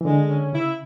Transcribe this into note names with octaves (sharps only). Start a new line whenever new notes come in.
E3
D3 G#3
C#4
C#3 E4